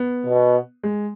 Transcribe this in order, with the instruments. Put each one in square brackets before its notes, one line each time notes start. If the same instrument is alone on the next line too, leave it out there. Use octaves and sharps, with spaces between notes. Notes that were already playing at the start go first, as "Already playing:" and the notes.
Already playing: [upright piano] B3
[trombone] B2
[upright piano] G#3